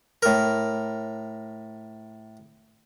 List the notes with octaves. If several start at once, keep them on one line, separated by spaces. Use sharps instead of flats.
A2 A#4